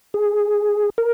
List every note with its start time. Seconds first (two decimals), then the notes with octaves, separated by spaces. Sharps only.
0.14 G#4
0.98 A#4